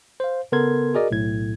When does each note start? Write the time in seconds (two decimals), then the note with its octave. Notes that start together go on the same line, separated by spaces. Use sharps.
0.20 C5 F5
0.52 C#3 B3 A4 A#4 C6 G#6
0.94 F#4 G#4 A#4 D5 D#5
1.11 B1 A2 G#6